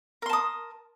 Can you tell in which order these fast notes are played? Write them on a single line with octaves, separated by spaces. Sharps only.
A#4 C6 A5 D#6